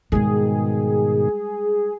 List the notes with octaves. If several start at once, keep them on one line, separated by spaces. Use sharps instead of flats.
G#2 B2 D#3 G3 G#3 G#4